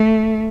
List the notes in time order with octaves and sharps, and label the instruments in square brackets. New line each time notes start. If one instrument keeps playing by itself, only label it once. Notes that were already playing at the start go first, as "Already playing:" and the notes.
Already playing: [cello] A3